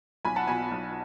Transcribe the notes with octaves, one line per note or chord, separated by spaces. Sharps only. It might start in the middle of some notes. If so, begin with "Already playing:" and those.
B1 G#5 B5
F#5 A5
B2 G#5 B5
B1